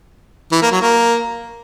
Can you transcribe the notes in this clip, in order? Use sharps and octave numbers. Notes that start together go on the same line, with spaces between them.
E3
A#3
F#3
A#3